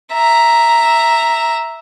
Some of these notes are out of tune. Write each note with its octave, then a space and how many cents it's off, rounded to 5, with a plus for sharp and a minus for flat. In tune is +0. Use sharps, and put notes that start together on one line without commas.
E5 +0 A#5 +0